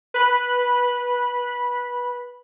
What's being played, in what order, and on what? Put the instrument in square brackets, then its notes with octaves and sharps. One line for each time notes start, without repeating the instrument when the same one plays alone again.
[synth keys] B4 B5